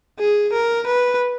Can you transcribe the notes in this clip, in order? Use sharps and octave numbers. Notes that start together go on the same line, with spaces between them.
G#4
A#4
B4